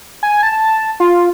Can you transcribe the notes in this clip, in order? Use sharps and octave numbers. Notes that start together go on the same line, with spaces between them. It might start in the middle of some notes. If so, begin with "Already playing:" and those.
G#5
A5
F4